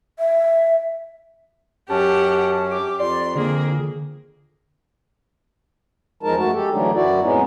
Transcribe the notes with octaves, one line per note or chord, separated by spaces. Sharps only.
E5
F#2 C#4 G4 F#5 A5
G4 D6
F2 D5 C6
D3 A#3 G#4
E2 F3 G#3 D#4 A#4 A5
F#2 A3 F#4 A5
G#3 G4 A4
D3 E3 F#3 A3 D4 D#4
F#2 E4 F#4 D5
F2 A2 G#3 B3 C#4 D#4